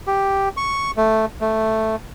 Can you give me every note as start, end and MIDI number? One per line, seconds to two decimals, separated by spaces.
0.07 0.49 67
0.57 0.91 85
0.97 1.25 57
1.41 1.96 57